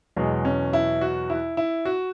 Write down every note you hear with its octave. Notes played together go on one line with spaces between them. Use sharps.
E2 B2 F#3 G#3
C#4
E4
F#4
E4
E4
F#4